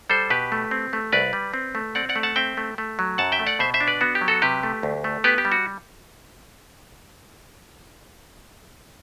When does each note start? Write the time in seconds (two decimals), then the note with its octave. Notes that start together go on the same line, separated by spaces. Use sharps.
0.10 G3 A4 C5
0.30 B2 G4 B4
0.52 A3
0.71 C4
0.93 A3
1.12 C2 B4 D5
1.33 G3
1.54 C4
1.75 A3
1.95 C4 D5 F#5
2.09 D5 F#5
2.16 A3
2.23 F#5 A5
2.36 C4 E5 G5
2.57 A3
2.78 A3
2.99 F#3
3.18 F#2 F#5 A5
3.32 E5 G5
3.39 A3
3.47 D5 F#5
3.59 B2 C5 E5
3.74 C5 E5
3.80 D4
3.87 B4 D5
4.01 B3 F#4
4.15 G4
4.21 F#3
4.28 F#4 A4
4.42 C3 G4 B4
4.63 A3
4.83 D2
5.04 A3
5.24 B3 G4 B4
5.38 G4
5.45 G3
5.52 F#4